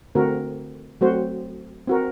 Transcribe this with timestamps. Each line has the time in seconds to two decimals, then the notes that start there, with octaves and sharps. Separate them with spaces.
0.15 D3 A3 C4 F#4 A#4
1.01 F#3 A3 C4 F#4 C5
1.87 C4 F#4 A#4